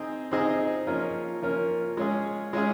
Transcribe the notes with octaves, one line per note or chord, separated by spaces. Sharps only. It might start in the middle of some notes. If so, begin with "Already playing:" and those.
Already playing: C4 D#4 G#4 C5 D#5
C4 D#4 G#4 C5 D#5
F3 A#3 C#4 F4 A#4
F3 A#3 C#4 F4 A#4
G#3 C#4 F4 G#4
G#3 C#4 F4 G#4